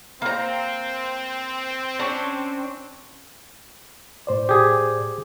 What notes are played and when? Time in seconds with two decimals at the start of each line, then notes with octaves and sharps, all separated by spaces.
0.22 A#3 C4 A#5
1.99 C#4 D4
4.27 A2 C5 D5
4.49 G4 G#4